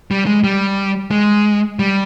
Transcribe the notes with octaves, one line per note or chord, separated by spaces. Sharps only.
G3
G#3
G3
G#3
G3